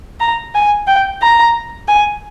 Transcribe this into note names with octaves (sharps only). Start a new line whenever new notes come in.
A#5
G#5
G5
A#5
G#5